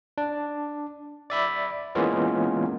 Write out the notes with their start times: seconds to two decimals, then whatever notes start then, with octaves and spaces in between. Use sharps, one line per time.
0.18 D4
1.30 D5 E5 B5
1.95 E3 G#3 A#3 B3 C#4 F4